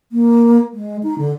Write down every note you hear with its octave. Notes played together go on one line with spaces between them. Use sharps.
A#3
G#3
D#4
D3